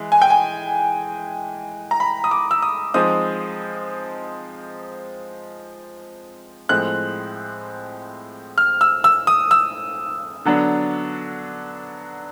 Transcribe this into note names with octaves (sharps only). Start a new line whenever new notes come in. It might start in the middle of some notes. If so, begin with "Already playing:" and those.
Already playing: E3 G#3
G#5
G5
G#5
A#5
B5
D#6
D6
E6
D#6
F3 G#3 C4 D#4 D#6
A2 F3 G#3 C4 F#6
F6
E6
E6
D#6
E6
D3 F#3 B3 D4